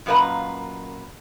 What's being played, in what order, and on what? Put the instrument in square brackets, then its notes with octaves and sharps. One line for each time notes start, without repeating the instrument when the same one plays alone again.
[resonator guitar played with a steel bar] F#2 A#2 F4 B4 D#5 A#5